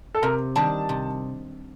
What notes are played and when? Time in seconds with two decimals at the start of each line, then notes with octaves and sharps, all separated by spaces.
0.15 A4
0.22 C3 A#4
0.56 D#3 G3 D4 A5
0.89 C3